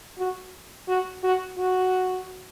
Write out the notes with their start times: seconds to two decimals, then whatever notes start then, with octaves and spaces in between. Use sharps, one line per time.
0.18 F#4
0.88 F#4
1.23 F#4
1.58 F#4